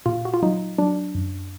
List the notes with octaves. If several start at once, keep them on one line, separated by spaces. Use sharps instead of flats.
A#2 F4
F#4
F4
F#3 D#4
F#3 D4
F#2